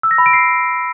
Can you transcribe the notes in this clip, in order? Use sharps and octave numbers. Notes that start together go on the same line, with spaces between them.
E6
A#6
B5
D7
C7